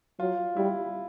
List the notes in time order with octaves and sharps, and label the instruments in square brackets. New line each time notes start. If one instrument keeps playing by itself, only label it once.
[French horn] F#3 [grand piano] F4
[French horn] G3 [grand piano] E4